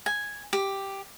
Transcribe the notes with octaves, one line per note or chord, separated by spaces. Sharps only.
G#5
G4